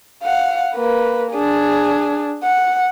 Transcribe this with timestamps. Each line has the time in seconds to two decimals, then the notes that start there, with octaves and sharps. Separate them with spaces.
0.23 F5 F#5
0.75 A#3 B4
1.32 D4 G#4
2.44 F#5